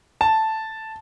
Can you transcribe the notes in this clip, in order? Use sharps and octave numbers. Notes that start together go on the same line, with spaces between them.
A5